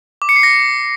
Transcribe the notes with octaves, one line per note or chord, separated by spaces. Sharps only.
D6
C#7
C7
A#6